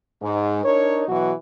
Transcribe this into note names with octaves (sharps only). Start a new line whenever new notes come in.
G#2
D4 D#4 A#4 C#5
B2 E3 F#3 F#4